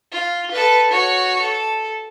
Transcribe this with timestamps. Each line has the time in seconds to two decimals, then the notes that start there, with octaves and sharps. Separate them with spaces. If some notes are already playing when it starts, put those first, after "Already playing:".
0.12 F4
0.51 A4 B4
0.91 F#4 C#5
1.42 A4